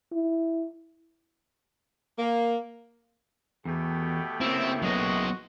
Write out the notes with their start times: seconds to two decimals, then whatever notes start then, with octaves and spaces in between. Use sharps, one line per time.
0.12 E4
2.19 A#3
3.65 E2 B2 A3 G4
4.41 A#3 C4 C#4 E4 E5
4.83 A2 F#3 G#3 B3 F#4 D#5